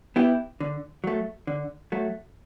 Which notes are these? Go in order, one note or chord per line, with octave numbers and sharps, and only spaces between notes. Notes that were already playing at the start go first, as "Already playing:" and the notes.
B3 E4 G4
D3
F#3 A3
D3
F#3 A3